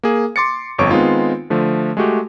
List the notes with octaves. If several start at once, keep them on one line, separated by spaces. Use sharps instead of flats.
A#3 G#4
C6 D6 A6 C#7
G1 F2 C#5 C#6 D7
D#3 G#3 B3 C4 D#4 F4
D3 F3 A3
G#3 A3 F#4 G4